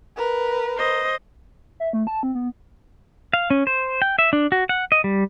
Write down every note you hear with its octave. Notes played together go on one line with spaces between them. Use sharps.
A#4 B4
C5 D#5
E5
A3
A5
C4
B3
F5
C#4
C5
G5
E5
D4
F#4
F#5
D#5
G3